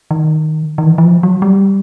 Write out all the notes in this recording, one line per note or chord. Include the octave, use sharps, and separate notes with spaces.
D#3
D#3
E3
E3
F3
F#3
G3